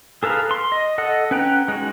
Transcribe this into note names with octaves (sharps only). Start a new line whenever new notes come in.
G#4 A4 B4 F5 A#5
C6
D#5
A4 D#5 F#5
C#4 B4 F#5 G5 A#5
G#3 D#4 F#4